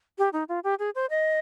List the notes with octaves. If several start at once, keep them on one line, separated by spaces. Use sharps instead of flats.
G4
D#4
F4
G4
G#4
C5
D#5